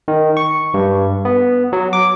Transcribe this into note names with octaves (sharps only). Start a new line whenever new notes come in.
D#3
C#6
G2
B3
F#3
D6